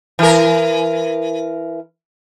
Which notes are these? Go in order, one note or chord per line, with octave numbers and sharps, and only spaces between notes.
E3 A#4